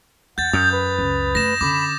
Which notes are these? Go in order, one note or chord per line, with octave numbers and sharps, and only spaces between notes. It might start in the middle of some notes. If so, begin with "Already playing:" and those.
E2 F#5 G6 A6
F#2 D#6 G6
B4
C#2
A3 A#6 E7
D3 C#4 B5 D6